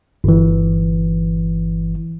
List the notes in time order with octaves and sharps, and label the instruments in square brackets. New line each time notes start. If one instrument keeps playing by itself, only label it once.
[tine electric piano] G1 E3